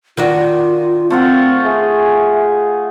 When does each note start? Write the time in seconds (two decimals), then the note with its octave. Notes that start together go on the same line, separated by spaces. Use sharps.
0.17 D#3 D4 F4 F#4
1.10 A3 C4 F4 F#5
1.64 G#4 E5